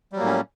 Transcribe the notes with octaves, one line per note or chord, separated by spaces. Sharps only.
A2 F#3 G3 A#3 C#4